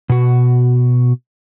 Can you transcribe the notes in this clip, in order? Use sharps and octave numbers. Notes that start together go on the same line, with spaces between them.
B2 F#4